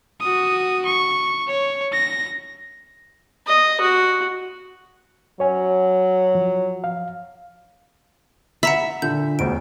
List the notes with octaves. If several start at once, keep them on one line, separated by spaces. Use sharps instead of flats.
F#4 D#6
C#6
C#5
A#6
D#5
F#4
F#3 C#5 G#5
F3
F5
E5 F#5 A#5 B5
A#2 D3 G6
E1 D2 D7